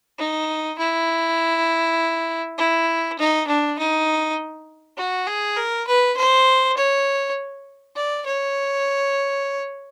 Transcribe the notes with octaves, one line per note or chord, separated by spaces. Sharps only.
D#4
E4
E4
D#4
D4
D#4
F#4
G#4
A#4
B4
C5
C#5
D5
C#5